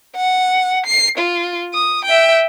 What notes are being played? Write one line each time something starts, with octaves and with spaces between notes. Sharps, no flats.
F#5
C7
F4
D#6
E5 G5